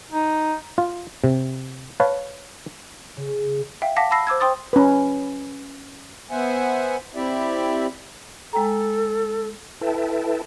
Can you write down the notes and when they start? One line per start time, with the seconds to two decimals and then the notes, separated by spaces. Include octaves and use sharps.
0.12 D#4
0.78 F4
1.24 C3
2.00 B4 C#5 F5 A5
3.17 C#3
3.82 E5 F5 G5
3.96 F5 F#5 A5 D6 A#6 B6
4.11 A5 B5 E6 A#6 C7
4.27 C5 D6 E6 G#6
4.40 C5 G5 C6 D#6 A6
4.73 C#4 B4
6.31 B3 C5 E5 F#5 G#5
7.15 C4 E4 G4 D5 E5
8.53 G#3 A4 G5 A#5
9.81 E4 A4 B4 E5 G5 A5